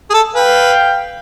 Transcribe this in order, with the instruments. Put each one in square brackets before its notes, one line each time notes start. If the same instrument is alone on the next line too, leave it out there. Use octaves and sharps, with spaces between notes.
[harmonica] G#4
A4
[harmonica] B4 [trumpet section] F5 G5